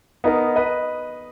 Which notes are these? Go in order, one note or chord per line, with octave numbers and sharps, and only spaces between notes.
B3 D#4 A#4
B4 D#5